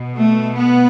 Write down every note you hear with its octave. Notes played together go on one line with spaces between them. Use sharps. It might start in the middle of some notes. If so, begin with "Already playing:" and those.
Already playing: B2
A3
B3